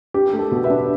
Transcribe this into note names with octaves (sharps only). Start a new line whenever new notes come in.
D4 G4
A3
A4
B2
B4 E5
D4